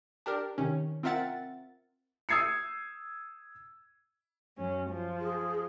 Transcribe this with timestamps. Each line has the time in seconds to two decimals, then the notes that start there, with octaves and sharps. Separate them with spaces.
0.26 D4 G4 A#4
0.58 C3 D#3 C#4
1.03 C4 F4 A#4 E5 F#5 A6
2.29 D#6 E6 G#6 C7 C#7
4.57 F#2 C#4
4.90 F3
5.21 G#4